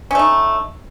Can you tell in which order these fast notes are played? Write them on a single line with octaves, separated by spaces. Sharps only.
C#4 A3 D#4